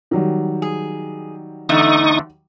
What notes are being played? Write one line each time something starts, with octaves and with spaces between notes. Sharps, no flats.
D#3 F#3 G3
G#4
E2 D3 A3 D#4 C#6 D#6